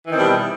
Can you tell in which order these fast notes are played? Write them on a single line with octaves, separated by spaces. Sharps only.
E3 D#3 C4 B2 G3